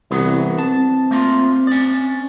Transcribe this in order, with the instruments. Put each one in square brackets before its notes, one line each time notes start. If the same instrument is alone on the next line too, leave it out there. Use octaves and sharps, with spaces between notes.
[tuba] C2 [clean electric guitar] E3 F#3 B3
[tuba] C4 [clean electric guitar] A5
[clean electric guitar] A3 A#3 F4
C#4 D5